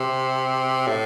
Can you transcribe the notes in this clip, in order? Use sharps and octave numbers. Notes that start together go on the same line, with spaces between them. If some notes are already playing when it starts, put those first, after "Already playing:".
Already playing: C3
A2